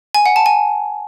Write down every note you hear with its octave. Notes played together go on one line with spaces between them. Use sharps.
G#5
F#5
A5
G#5